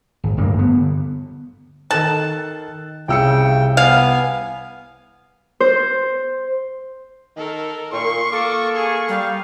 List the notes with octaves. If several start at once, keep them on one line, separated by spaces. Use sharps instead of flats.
G#1
D1 G2 G3 A#3
D3 B3
D#3 A4 A5 F#6
C2 C#3 G5 E6 C#7
B3 F5 G#5
C5
D#3 A4 A#4
A#2 C6 C#6
A#3 A4 D6
G#4 C#6
G3 F5